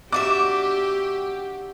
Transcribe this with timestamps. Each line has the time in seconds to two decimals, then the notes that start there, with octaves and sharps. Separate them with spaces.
0.12 D4 F#4 G4 E5 D6